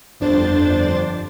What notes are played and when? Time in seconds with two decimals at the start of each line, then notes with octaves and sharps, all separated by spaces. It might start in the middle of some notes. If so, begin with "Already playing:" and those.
0.20 G1 F2 D4 C5 A6